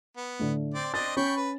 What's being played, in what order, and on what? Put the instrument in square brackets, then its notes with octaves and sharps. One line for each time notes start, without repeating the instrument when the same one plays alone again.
[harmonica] B3
[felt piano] A2 D3
[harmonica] C4 D5
[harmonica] C4 D4 D#5 [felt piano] A6
[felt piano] C#4 [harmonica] G5 B5 C#6
[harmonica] B4